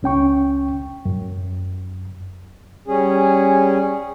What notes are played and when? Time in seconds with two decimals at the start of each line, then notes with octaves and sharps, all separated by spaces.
0.03 C#2 C#4 G5 C#6
1.05 F#2
2.88 G3 C#4 G#4